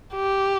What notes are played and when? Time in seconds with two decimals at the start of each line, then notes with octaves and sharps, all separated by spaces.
0.15 G4